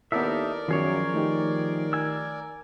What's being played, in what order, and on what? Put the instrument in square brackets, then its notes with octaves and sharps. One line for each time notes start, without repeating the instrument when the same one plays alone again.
[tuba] D#2 [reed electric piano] B3 E4 [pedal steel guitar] D#4 A4 E5 [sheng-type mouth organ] A#4 D5
[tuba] F#2 [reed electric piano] D#3 [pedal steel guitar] F3 G#4 C#5
[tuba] D#3 [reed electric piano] A3 D#4 G4
[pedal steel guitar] G#5 E6